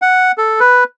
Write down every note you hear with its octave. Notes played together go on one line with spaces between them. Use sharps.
F#5
A4
B4